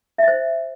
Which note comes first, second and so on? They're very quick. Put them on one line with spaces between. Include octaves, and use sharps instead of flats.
E5 D#5 C5